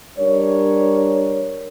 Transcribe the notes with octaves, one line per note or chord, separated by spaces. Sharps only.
G3 D4 A#4 C#5